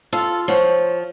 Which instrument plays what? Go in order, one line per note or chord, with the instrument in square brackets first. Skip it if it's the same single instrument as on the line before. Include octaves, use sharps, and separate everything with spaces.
[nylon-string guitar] F4 [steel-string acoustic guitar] A4
[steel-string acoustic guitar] F3 [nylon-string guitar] C5 C#5 F#5